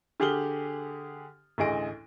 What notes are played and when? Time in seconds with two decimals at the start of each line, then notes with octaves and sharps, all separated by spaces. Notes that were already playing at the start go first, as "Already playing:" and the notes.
0.20 D3 G4 G#4 F6 F#7 G7
1.58 A1 D2 G#4 D#5 D7